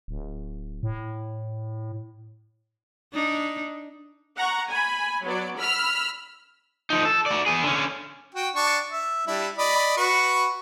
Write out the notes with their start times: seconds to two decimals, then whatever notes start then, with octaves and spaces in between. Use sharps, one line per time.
0.08 D1
0.83 A2
3.13 D4 D#4
4.37 F#5 A#5 C#6
4.69 G#5 B5
5.24 F#3 B3 D5
5.57 B5 E6 F6
6.90 F3 D#4
7.05 A4
7.26 F#4 D5
7.46 B3 G#4
7.63 D3 C#4
8.35 F#4 G5
8.55 D4 C#6
8.91 E5
9.27 G3 D4 E4
9.58 D5 D#5 B5
9.97 F#4 B4 C#6